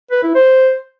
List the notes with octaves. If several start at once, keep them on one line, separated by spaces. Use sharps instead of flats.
B4
E4
C5